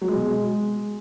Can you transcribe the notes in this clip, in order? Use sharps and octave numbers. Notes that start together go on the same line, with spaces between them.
F#3
G#3
B2
G#3